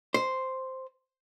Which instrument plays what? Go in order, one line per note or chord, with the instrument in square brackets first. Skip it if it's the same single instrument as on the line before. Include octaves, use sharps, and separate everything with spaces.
[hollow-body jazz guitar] C5